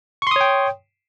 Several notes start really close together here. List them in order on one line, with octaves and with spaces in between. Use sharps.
C#6 C6 D#6 C#5 G5